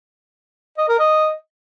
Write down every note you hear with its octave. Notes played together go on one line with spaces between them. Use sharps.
D#5
A#4
D#5